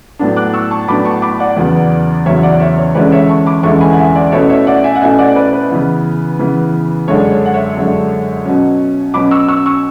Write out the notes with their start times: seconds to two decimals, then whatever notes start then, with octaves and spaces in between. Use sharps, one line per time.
0.19 A2 F#3 B3 D4
0.37 D6 F#6
0.54 C#6 E6
0.71 A5 C#6
0.88 A2 F#3 B3 D4 B5 D6
1.05 A5 C#6
1.22 B5 D6
1.40 D5 F#5
1.57 E2 C#3 F#3 B3
2.26 E2 C#3 F#3 B3 C#5 E5
2.43 D5 F#5
2.60 C#5 E5
2.77 C#5
2.95 E2 D3 G#3 C#4 E4 B4 D5
3.12 C#5 E5
3.29 A5 C#6
3.46 B5 D6
3.63 E2 D3 G#3 C#4 E4 A5 C#6
3.81 G#5 B5
3.93 F#5
3.98 E5 G#5
4.15 D5 F#5
4.32 B2 A3 C#4 E4 C#5 E5
4.50 C#5 E5
4.67 D5 F#5
4.84 E5 G#5
4.95 F#5
5.01 B2 A3 C#4 E4 E5 G#5
5.18 D5 F#5
5.36 B4 D5
5.53 B4
5.70 C#3 E3 B3
6.39 C#3 E3 B3
7.08 F#2 D3 G#3 D4 C#5
7.31 C#5
7.46 F#5
7.54 C#5 E5
7.77 F#2 D3 G#3 D4
8.45 B2 F#3 C#4
9.14 B2 F#3 C#4 B5 D6
9.31 C#6 E6
9.48 C#6 E6
9.66 C#6 E6